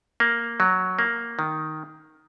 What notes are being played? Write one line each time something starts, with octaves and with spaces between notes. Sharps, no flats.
A#3
F#3
A#3
D#3